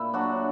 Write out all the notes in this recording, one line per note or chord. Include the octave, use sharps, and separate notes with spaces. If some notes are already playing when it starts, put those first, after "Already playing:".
Already playing: A#2 E4
F#3 D4 F#4